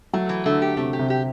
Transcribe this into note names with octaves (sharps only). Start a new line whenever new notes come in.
F#3 A3
E3
D3 A3
G4
C3 A3
G4
C3
G4